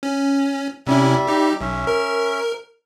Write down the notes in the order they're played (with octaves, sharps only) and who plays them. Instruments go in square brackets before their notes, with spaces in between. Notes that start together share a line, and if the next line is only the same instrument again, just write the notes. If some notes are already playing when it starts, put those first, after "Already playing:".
[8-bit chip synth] C#4
[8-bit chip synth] C3 C#4 E4 [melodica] G3 E5
[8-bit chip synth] D#4 G4
[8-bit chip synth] B1 [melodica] C#4 E5
[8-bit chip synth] A#4